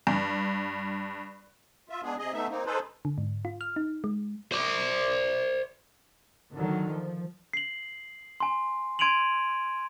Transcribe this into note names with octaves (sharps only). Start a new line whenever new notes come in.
G2
F4 E5
G#3 B3 D4 G#4
C3 G#4 D#5
A3 B3 D#4 E5
A#3 C4 D#4
D#4 G#4 A4 B4 C5
D3
G#2
F4
F6
D#4
G#3
C5 D5
D3 D#3 F#3
F3
C7 F#7
G#5 C6
C6 G#6 D7 D#7 F7 F#7